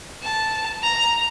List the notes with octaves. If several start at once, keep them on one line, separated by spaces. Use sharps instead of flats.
A5
A#5